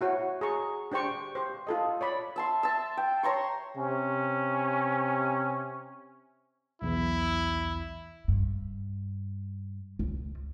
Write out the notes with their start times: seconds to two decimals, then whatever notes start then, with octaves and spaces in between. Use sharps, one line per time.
0.01 E4 F#4 C#5
0.41 G#4 A#5 C#6
0.92 D4 G4 C5 G5 C#6
1.35 G4 C5
1.67 F4 A4 D#5
2.01 C#5 D5 B5
2.36 E5 A5 C6
2.63 E5 A5
2.97 G5
3.23 C#5 A#5 C6 C#6
3.77 C3 C#4
6.82 B1 E2 E4
8.28 G2
9.99 C#2